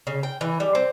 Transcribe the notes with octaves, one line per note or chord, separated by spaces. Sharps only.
C#3
G5
E3
G3
C4